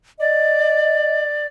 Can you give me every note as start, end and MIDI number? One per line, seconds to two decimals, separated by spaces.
0.19 1.46 74
0.19 1.23 75